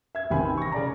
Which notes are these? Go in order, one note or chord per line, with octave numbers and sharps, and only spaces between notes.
E5 G#6
A1 C3 D#3 C4 G#5 B5
C#6 A#6
C#3 D5 A#5